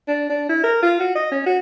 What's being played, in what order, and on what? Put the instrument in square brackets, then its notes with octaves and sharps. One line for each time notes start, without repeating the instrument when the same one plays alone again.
[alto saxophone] D4
D4
E4
A#4
F4
F#4
D#5
C#4
F#4